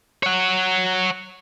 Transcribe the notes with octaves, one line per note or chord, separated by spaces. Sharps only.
C#5 F#5